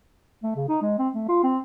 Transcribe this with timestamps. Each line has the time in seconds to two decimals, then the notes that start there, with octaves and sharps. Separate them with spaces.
0.43 A3
0.56 C#3
0.69 D#4
0.82 G#3
0.98 C4
1.15 A3
1.29 F4
1.43 C4